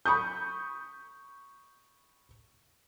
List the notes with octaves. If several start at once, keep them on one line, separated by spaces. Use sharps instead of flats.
B5 C#6 D#6 G6